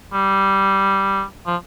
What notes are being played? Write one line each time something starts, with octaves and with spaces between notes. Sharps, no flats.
G3
F3